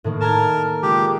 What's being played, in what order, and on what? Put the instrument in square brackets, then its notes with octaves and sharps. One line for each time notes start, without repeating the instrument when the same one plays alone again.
[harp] A2 D#3 A#3
[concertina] A#4 [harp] A5 A#5 G#6
[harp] G#3 A#3 F4 [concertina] G4